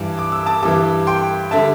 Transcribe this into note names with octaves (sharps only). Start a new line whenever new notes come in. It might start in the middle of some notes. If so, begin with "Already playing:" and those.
Already playing: G2 E3 G3 A5 D6
D6
E6
A5 D6
G2 E3 G3 A5 D6
G5 C6
D3 G3 E5 A5